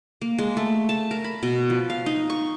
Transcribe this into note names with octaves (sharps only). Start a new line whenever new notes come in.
A#3
G#3
A3
A5
A#4
B5
B2
F3
F5
D#4
C#6